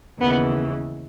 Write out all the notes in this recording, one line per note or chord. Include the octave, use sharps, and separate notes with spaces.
D#2 C#3 E3 B3